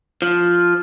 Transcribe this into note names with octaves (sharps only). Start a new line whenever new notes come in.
F3